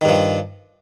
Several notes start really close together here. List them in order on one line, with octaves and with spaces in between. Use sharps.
D#3 G2 F3